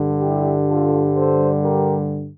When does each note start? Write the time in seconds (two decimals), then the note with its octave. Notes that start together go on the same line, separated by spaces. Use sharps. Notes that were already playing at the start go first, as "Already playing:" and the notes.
Already playing: G2 D3 G3
0.21 E4 G4
0.69 F4 A4
1.16 A4 C5
1.63 G4 A#4